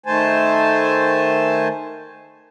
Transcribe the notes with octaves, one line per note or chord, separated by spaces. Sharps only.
D#3 A3 C5 G#5 A5